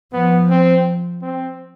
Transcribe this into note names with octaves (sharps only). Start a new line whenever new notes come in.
F3 B3
C4
C4